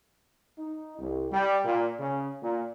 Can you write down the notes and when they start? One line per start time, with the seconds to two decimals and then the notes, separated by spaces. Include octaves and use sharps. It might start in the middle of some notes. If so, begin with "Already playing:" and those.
0.58 D#4
0.98 C2
1.32 G3
1.65 A#2
1.99 C#3
2.42 A#2